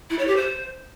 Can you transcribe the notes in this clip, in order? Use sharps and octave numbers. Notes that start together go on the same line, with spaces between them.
E4
C#5
G4
C5